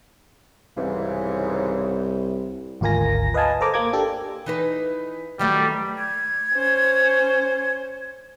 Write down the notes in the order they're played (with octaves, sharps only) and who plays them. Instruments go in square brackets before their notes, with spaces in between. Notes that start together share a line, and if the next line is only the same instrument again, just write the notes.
[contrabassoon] C2 [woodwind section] G#2 C#3 E3
[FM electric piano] G#1 D2 F4 A#4 G#5 A#6
B4 D#5 F5 G#5 A5
A4 A#4 C5 A#5 D6
A#3 D6 G#6
D4 G4 A4
[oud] E3 D#4 B4
[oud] D#3 F#3 A3 [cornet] G3
[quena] G#6
[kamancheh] C#4 C5